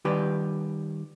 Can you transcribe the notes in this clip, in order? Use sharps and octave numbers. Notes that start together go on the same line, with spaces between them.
D#3 G3 G4 B4